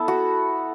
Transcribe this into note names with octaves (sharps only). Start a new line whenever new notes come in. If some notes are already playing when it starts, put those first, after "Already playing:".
Already playing: B3 E4 A4
F#4